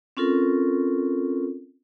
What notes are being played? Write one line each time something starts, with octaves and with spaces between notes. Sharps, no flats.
C4 C#4 F4 A4 A#4